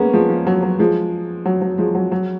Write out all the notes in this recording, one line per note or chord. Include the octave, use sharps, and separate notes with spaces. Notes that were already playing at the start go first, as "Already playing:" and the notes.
Already playing: G#3 A#3 B3 C#4
F3 G#3
F3
F#3
F#3
F3 G#3
F#3
F#3
F3 G#3
F#3
F#3